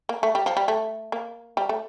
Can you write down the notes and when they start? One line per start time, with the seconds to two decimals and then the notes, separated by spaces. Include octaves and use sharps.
0.09 A#3
0.23 A3
0.35 G3
0.46 F3
0.57 G3
0.68 A3
1.12 A#3
1.57 G3
1.69 A3